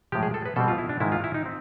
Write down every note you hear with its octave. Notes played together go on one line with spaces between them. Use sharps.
A2 F3 G#3 G4
G#4
A4
B4
B2 G3 C4 A4
F4
E4
D4
G#2 D#3 G#3 E4
F4
E4
D#4
C4